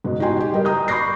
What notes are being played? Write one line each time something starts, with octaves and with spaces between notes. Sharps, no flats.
F#1 G#2 B2
D#4 F#4 G4 G5 G#5 C6
G4
G3 G4 A#4 D#5
A#5 D#6 G6
B5 C#6 D6 G6 A#6 C7